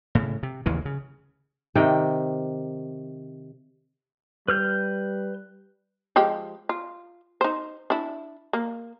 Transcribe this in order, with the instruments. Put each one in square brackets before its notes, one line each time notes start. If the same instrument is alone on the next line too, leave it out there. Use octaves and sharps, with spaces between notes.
[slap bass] A2 C#3
C3
A1 D#2 C#3 E3
C#3
[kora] C3 D#3 D5 G5
[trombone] G3 [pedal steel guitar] B4 F6 G6
[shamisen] F3 G#3 G4
F4
D#4 C5
D4 E4
A#3